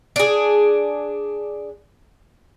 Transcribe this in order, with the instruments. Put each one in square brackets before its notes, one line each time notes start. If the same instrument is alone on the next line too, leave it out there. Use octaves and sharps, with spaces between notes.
[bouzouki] D4 G#4